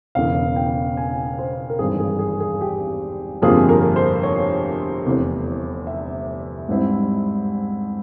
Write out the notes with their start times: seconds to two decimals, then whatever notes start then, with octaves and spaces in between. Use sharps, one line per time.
0.15 E1 E2 C#3 F5
0.56 G5
0.97 G#5
1.39 C5
1.69 A#4
1.79 G#1 G2 E3 G#4
2.00 G#4
2.19 G#4
2.40 G#4
2.61 G4
3.42 G1 F2 C3 F3 A#3 G#4
3.69 A#4
3.96 C5
4.23 C#5
5.06 F1 E2 C3
5.87 E5
6.69 G#2 G3 C4 E4